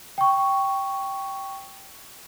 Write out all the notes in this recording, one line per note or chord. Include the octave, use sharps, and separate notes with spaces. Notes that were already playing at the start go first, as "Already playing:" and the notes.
G5 C#6